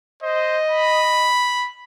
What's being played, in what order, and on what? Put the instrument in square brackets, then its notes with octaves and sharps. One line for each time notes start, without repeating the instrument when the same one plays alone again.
[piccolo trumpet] C5 [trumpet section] D#5
[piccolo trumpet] B5